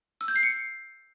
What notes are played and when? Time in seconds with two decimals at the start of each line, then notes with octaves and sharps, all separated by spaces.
0.21 E6
0.28 G6
0.36 C7
0.43 C#7